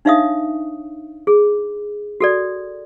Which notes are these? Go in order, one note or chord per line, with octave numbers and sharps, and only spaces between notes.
D4 D#4 C#5 E5 F5 D#6
G#4
F#4 A4 D5